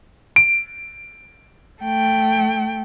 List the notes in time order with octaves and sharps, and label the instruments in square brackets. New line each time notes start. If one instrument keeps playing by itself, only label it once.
[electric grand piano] D7
[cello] A3 G5